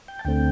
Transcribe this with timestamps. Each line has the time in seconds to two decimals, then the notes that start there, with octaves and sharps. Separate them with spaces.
0.08 G5
0.19 A5
0.25 D2 D3 A3 C4 G5